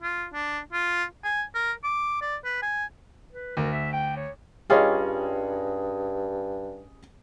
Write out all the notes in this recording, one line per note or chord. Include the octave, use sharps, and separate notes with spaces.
F4
D4
F4
G#5
A#4
D6
D5
B4
G#5
B4
D2 A#4
E5
G5
C#5
G2 G3 C#4 F4 G#4 C#5 D#5